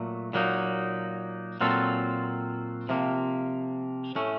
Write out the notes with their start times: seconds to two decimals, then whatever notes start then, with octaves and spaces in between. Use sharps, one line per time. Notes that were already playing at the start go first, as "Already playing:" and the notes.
Already playing: A#2 F#3 A3
0.33 A#2 F#3 A#3 D#4
1.61 A#2 F#3 C4 F4 A4
2.89 C3 F3 A#3
4.15 A2 A3 C#4